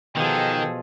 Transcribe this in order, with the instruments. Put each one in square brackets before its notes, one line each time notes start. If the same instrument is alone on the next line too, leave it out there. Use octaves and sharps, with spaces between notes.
[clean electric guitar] B2 F3 [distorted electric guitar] D#3 [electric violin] G#4 A4 [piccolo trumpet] G5